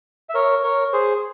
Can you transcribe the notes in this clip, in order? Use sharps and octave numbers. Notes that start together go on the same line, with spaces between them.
E5
A#4 C#5
A#4 C#5
G#4 C5